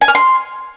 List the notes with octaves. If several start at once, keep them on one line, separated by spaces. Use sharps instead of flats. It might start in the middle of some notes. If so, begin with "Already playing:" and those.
G#5
F6
C6